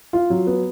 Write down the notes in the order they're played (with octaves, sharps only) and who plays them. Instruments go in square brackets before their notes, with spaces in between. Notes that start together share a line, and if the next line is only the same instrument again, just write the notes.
[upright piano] F4
F#3
B3